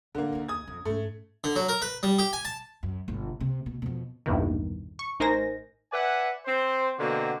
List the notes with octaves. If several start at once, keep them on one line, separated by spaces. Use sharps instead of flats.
A1 D3 A#3
D#2 D#4
D#6 G#6
F2
G#2 A3 C#4
D3
F#3
A#4
B4
G3
G4
G#5
A5
F#2
G1 B2
C3
B2
F2 B2
A#1 E2 G2 B2 D#3
C#6
A1 D#4 A#4 C5 G#5 A#6
B4 D5 E5 F#5 G#5
C4 C5
B2 D3 A#3 C4 F#4